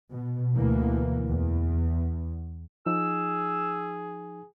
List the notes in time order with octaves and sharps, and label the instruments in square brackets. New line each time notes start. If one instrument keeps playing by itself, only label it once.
[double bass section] B2
D2 B2 E3 A#3
E2
[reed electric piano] F3 D#4 [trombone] G#4 [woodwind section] E6